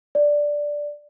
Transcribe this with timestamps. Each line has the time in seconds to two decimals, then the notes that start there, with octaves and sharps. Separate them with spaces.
0.15 D5